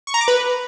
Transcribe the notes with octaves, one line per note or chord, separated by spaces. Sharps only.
C#6
A#5
D6
B4